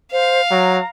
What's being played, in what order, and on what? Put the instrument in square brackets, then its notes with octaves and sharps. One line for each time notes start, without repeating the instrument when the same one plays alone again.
[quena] C5 [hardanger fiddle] F5
[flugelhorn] F#3 [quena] A#5